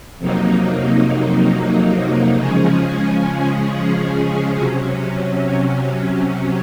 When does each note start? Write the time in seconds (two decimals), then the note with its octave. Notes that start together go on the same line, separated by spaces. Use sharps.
0.18 F2 C3 F#3 A#3 D#4
2.37 C#3 F3 G#3 C#4 G#4
4.57 C3 F#3 C#4